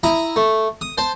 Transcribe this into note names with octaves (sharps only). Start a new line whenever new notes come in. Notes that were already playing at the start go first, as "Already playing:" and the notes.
E4 A#5 D#6
A3
D#6
C5 A5